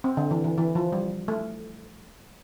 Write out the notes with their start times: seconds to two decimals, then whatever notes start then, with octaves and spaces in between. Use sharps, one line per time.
0.04 C4
0.17 D3
0.31 E3
0.44 E3
0.58 E3
0.75 F3
0.92 G3
1.28 A3